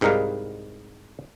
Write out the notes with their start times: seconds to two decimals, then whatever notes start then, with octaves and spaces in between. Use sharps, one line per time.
0.01 C2 G#2 G3 D#4 A#4 F5